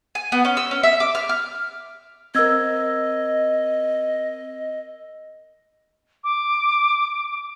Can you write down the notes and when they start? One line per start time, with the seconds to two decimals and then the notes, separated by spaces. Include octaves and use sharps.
0.15 G#5
0.32 B3
0.45 C#4
0.57 E6
0.71 C#4
0.83 E5
1.00 D6
1.15 F6
1.29 F6
2.35 C4 A#4 D#5 E6 G#6
6.24 D6